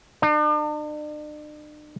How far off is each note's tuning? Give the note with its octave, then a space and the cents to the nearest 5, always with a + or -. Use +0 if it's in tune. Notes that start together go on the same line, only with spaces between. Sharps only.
D4 +45